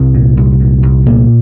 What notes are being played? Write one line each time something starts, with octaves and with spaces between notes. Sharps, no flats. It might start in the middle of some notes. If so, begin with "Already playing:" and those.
Already playing: C2 C4
A#2
C2
A#2
C2
A#2 A#3